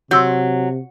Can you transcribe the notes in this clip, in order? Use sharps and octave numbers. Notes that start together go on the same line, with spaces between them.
C3 F#3 C6 E6 G6